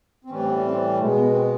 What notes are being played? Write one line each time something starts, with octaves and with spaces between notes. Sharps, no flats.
C4
A2 E3 G3 C#4
C4
B3
C#4
C4
B2 G#3 A3
B3
C4